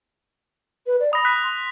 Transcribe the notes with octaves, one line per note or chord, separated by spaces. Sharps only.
B4
D5
B5 D#6 A#6
F#6 B6
C6